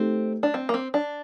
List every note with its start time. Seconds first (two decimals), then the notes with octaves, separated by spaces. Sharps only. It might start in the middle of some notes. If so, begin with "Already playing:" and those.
Already playing: A3 C4 D#4 G4
0.43 D4
0.54 C4
0.69 A#3
0.74 C4
0.94 D4